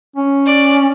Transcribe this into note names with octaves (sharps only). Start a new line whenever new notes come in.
C#4
D5